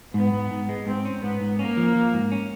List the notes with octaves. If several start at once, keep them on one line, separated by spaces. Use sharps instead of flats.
G#2 B3
G#2
G#2
G#3
G#2 C4
C#4
G#2 B3
G#2
A#3 C#4
F3
F3
G#2
C#4